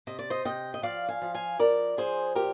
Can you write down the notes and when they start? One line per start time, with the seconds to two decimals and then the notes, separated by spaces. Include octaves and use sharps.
0.07 C3 D#5
0.19 D5
0.30 C5 D#5
0.45 C3 D#5 G5
0.74 D#5
0.83 F3 D5 F5
1.09 F5 G#5
1.22 F3
1.34 F5 G#5
1.59 F3 A#4 D5
1.97 F3 G#4 C5
2.35 A#2 G4 A#4